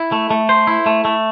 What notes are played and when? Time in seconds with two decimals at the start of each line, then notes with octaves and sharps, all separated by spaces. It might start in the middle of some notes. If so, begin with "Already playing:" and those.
Already playing: E4
0.12 A3
0.30 A3
0.49 C5
0.67 E4
0.86 A3
1.05 A3